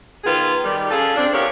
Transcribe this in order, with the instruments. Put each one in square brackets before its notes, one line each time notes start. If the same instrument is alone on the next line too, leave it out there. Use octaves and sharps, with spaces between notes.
[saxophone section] D#3 B3 F4 G#4 B4
D#3 G3
C#4 F4 G#4 A4
C4 D4
E2 F3 G4 A#4 C#5